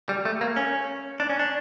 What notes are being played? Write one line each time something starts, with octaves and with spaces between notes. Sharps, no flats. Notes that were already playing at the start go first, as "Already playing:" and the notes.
G3
A3
A#3
C#4
D4
C#4
D4